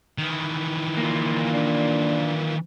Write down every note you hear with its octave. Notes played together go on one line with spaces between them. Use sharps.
D#3 E3
A#3 F4
D4